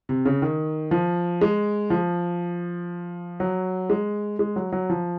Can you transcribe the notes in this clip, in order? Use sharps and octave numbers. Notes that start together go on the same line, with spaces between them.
C3
C#3
D#3
F3
G#3
F3
F#3
G#3
G#3
F#3
F#3
F3